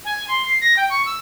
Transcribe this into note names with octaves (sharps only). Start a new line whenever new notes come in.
G#5
C6
C7
A#6
G5
C#6
E6